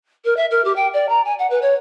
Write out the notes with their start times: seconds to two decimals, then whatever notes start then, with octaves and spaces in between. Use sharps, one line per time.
0.24 A#4
0.36 E5
0.50 A#4
0.64 G4
0.76 G5
0.93 D5
1.09 A#5
1.25 G#5
1.39 F#5
1.50 B4
1.62 C#5